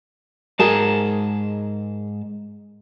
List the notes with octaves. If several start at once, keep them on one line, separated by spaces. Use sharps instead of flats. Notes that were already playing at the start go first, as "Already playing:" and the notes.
G#2 G#4 A#4 A5